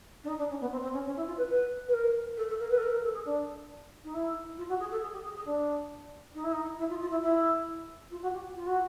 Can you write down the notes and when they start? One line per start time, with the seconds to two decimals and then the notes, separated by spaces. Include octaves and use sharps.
0.23 D4
0.27 D#4
0.38 D4
0.49 C#4
0.60 B3
0.71 C4
0.82 C4
0.93 C#4
1.05 C#4
1.16 E4
1.27 F4
1.37 B4
1.49 B4
1.87 B4
1.93 A#4
2.36 A4
2.48 A4
2.59 A#4
2.69 B4
2.77 A4
2.81 A#4
2.92 A#4
3.03 A4
3.13 G#4
3.25 D4
4.04 D#4
4.14 E4
4.57 F4
4.68 F#4
4.79 G#4
4.91 A4
5.02 G#4
5.12 G4
5.23 G#4
5.35 G#4
5.45 D4
6.34 D#4
6.43 E4
6.52 D#4
6.78 E4
6.89 F4
7.00 F4
7.10 E4
7.21 E4
8.10 F4
8.22 F#4
8.33 G4
8.54 F4
8.66 F#4